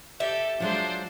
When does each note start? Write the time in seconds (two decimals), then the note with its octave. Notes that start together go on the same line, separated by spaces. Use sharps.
0.20 G4 A4 E5
0.60 F3 F#3 G#3 D4 C5